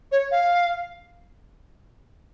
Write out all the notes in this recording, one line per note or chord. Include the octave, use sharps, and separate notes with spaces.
C#5
F5